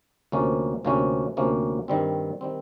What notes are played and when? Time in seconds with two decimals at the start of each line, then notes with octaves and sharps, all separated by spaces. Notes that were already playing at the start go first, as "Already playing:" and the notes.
0.32 D2 C3 F3 A#3 C#4
0.85 D2 C3 F3 A#3 C#4
1.37 D2 C3 F3 A#3 C#4
1.88 G2 D#3 G3 C4
2.41 D#3 G3 C4